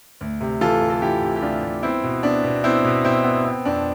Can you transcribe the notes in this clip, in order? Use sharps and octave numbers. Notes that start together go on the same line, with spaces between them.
D2
C3
E3 F4 A4
C3
A4
E3 E4 G4
C3
G4
D2 D4 F4
D2
B3 C4 E4
B2
B3 D4
B2
B3 C4 E4
B2
B2 C4 E4
B3
C4
F2 D4